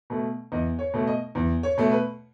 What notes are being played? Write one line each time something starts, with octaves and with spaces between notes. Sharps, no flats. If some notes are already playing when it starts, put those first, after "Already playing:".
B2 A3
E2 D#5
C#5
B2 A3
D#5
E2
C#5
B2 A3
B4